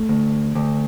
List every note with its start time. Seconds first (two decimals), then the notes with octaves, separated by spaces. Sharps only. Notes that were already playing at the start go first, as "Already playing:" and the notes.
Already playing: A3
0.09 D2
0.55 D2